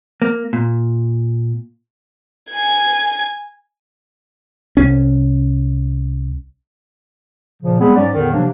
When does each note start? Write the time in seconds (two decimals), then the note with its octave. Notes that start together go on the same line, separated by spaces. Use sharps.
0.22 A#3
0.53 A#2
2.52 G#5 G#6
4.77 C2 C#4
7.63 A#2 C#3 F3
7.80 G3 G#3 B3 C4 G#4
7.96 G#2 F#3 C#4 D5
8.14 E2 A2 D3 D#3
8.33 C3 F3 F#3 A#3 D4